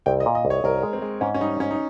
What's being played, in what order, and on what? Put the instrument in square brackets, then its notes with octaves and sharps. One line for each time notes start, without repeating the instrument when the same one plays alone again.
[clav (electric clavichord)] C2 [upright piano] G5
[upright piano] D#5
[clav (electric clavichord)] A#2
[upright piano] D#5
[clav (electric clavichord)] C2
[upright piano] C#5
[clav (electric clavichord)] C2 [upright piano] A#4
[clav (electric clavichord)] G#3
[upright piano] C4
[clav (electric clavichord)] G#3
[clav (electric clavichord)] G#2 [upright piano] C#4
[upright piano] C#4
[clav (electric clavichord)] G3 [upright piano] D#4
[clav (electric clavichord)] G#2 [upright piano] C#4
[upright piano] D#4